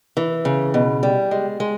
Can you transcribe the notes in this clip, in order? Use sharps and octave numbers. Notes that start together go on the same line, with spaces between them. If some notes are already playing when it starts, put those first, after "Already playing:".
E3
C#3
B2
G3
G#3
G#3